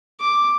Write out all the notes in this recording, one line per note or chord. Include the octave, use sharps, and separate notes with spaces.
D6